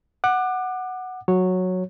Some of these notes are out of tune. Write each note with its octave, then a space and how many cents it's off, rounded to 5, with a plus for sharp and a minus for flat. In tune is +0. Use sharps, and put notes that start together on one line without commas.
F#5 +0 D6 +30
F#3 -10 C#5 -5